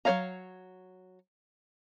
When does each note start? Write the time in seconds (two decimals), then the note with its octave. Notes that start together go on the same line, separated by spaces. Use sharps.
0.05 F#3 G#4 C#5 F5 A#5